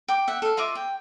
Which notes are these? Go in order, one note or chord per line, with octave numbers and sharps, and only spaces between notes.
G5 D6
E5 F#5
A4 F5
F4 D#5 E5 D6
G5